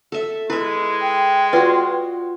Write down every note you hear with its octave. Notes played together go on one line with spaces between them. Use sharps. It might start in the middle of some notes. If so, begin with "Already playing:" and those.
A4 E5
G#3 E4 B4 E5
G5
F4 F#4 B4 D5